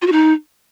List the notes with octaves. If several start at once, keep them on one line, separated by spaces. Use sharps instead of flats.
F4
F#4
D#4